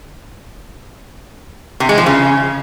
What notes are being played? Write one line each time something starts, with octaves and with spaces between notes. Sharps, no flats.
C3
G#3
F3
C#3